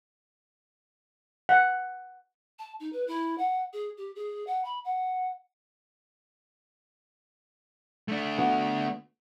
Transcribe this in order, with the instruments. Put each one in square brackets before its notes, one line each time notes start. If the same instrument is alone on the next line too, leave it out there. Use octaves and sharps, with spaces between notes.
[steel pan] F#5
[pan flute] A5
D#4
B4
E4
F#5
G#4
G4
G#4
F#5
B5
F#5
[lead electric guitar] A3 D4
[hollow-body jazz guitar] D3 B3 F#4